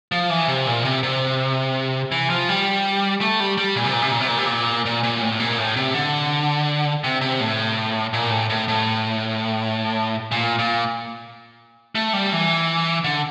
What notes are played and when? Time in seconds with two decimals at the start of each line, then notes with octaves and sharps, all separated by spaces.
0.12 F3
0.30 E3
0.48 C3
0.67 A#2
0.85 C3
1.03 C3
2.12 E3
2.30 F3
2.49 G3
3.21 A3
3.40 G3
3.58 G3
3.76 A#2
3.84 C3
3.93 A#2
4.02 C3
4.11 A#2
4.20 C3
4.28 A#2
4.38 C3
4.46 A#2
4.86 A#2
5.03 A#2
5.22 A2
5.40 A#2
5.58 A2
5.76 C3
5.94 D3
7.04 C3
7.21 C3
7.41 A2
8.13 A#2
8.31 A2
8.50 A2
8.68 A2
10.32 A#2
10.59 A#2
11.95 A3
12.13 G3
12.32 E3
13.04 D3